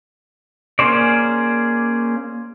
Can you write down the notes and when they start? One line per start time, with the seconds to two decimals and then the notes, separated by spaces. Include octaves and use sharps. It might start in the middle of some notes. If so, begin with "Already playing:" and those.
0.79 A#3 C#4 G#4 C5 D5